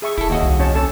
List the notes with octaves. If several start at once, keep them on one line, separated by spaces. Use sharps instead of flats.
G#4 E5 C#6
E1 E4 A4
D#2 F#4 D#5
C2
C#4 C#5 A5
C#4 A4 A5